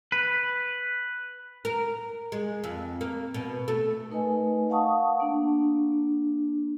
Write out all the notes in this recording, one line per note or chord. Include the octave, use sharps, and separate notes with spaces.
B4
A#4
G#3
F2
A#3
B2
A3
A3 D#4 A#4 B4 D#5 G#5
F5 F#5 A5 C#6 D#6
A#3 D4